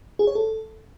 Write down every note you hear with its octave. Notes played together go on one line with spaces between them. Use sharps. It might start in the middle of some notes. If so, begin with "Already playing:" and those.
G#4
C#5
A4